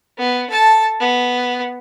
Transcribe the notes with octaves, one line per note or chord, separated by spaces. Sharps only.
B3
A4 A5
B3